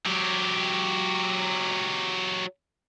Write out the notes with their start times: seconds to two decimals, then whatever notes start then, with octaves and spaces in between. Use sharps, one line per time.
0.06 F#3 G4